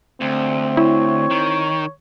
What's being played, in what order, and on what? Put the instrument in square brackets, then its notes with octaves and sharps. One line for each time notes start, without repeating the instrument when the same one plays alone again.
[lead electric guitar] D2 [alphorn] C4
[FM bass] E4 [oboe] C#5
[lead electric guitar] D#3